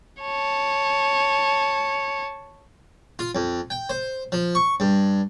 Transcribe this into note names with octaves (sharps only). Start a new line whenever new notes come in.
C#5 A5
F4
F2
G5
C5
F3
C#6
G2